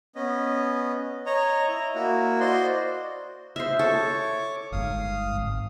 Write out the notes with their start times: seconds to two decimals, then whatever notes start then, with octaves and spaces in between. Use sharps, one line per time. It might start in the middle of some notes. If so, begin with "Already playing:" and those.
0.15 B3 C#4 D#5
1.26 C#5 D#5 A#5
1.69 E4 D#5 A#5
1.95 A#3 E4 F#4
2.40 F#4 C5 D5 D#5 C6
3.56 C5 D#5 E5 F6
3.79 A4 C#5 C#6 D6
4.72 G1 G#2 F5 D#6
5.35 G#1